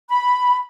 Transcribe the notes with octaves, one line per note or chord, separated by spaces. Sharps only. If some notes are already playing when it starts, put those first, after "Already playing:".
B5